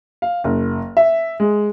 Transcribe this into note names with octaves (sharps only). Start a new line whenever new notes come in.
F5
F#1
E5
G#3